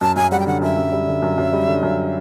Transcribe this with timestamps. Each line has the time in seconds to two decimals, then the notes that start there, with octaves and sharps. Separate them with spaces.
0.01 F#2 A5
0.16 F#2 G#5
0.32 G3 F#5
0.39 G5
0.46 D3 F#5
0.62 F#2 E5
0.77 F#2
0.92 G3
1.07 D3
1.22 F#2
1.38 F#2
1.53 G3
1.68 D3
1.83 F#2